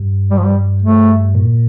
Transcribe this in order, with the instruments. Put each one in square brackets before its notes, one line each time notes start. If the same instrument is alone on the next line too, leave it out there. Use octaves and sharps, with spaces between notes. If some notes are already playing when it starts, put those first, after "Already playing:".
Already playing: [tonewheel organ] G2
[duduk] G3
F3
G3
A3
[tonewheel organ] A#2